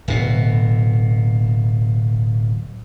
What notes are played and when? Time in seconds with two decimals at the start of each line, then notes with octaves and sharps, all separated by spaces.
0.08 D1 B2